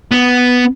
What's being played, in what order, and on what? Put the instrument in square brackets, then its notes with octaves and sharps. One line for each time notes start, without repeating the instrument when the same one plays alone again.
[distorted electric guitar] B3